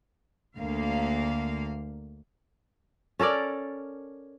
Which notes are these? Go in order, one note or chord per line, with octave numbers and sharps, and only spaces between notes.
D2 A#3 F5
C#4 A4 A#4 D5